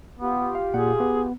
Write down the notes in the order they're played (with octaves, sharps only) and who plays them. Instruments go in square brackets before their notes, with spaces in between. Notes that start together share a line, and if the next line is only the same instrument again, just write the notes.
[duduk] B3 [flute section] F4 G4
[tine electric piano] F5
[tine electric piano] A#2 F#5 [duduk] G#4
[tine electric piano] B3